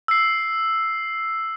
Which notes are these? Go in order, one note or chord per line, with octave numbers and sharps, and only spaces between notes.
E6 C7